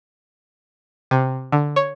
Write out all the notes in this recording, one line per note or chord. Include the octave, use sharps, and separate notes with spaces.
C3
D3
C#5